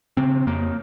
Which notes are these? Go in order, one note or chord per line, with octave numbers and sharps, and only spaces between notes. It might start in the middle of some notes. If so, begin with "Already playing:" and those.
C#3 C4
F2 A#3